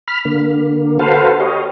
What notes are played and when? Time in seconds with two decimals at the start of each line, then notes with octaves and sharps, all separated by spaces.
0.08 B5 F6
0.25 D3 A#3
0.99 F#4 A4 B4 C5 F5
1.40 G4 C#5 D#5